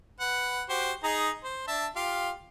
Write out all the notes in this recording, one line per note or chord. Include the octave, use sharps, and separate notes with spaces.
B4 F#5
F#4 G4 C5
D#4 G#4 A#5
C5
D4 E5 A5
F4 G4 F5